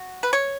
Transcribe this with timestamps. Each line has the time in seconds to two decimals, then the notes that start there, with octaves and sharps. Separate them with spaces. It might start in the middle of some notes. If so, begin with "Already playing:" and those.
Already playing: F#4
0.23 B4
0.33 C#5